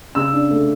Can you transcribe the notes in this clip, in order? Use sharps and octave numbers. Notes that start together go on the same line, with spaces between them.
C#3 E6
D4
A3